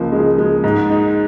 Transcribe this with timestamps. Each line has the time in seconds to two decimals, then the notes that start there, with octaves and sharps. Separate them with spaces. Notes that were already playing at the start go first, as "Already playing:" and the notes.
Already playing: C#2 F3 A#3
0.12 G#3
0.38 G#3
0.64 G#2
0.89 D#4